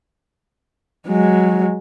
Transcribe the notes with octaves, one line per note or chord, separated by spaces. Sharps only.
F#3 G#3